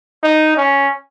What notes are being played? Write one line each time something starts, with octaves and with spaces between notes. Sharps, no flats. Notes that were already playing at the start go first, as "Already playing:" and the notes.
D#4
C#4